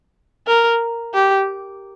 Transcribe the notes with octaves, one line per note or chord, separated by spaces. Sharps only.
A#4
G4